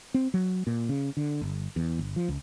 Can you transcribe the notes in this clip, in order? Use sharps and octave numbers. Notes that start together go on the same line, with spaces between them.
C4
F#3
A#2
C#3
D3
G1
E2
G1
F3
C#2